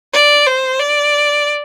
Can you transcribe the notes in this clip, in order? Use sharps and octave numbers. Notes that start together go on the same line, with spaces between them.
D5
C5
D5